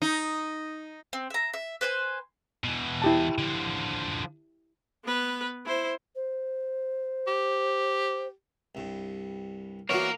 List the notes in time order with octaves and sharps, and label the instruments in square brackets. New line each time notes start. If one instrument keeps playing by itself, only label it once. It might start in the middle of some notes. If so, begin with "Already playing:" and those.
[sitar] D#4
[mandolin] C4
E5 A#5
E5
B4 C5 G5 G#5
[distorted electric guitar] B2 E3
[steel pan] E4 G4 A5
[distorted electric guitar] D3 F3
[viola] B3 B4
E4 C5
[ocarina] C5
[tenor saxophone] G4
[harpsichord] C2 G2
[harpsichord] E3 B3 D4 [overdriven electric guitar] A#3 A#4 [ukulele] F#4 C#5